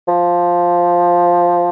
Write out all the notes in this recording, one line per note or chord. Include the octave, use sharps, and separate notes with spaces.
F3